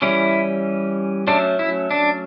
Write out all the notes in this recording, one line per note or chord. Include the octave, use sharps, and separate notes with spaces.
E3 G3 C#4 E4
F#3 A3 C#4 D4
E4
D4